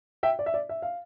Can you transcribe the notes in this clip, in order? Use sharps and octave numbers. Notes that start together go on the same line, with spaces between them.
E5 G5
D5
E5
D5
E5
F5